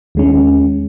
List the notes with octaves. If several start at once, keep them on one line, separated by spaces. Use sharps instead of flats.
D#2 G#3 C#4